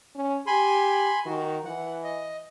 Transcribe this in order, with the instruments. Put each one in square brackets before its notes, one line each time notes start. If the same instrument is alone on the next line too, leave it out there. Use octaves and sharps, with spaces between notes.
[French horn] C#4
[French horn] G4 [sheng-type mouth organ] G#5 B5 C6
[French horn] D#3 [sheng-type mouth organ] F#4
[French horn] E3 [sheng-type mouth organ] F#5
[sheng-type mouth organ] D#5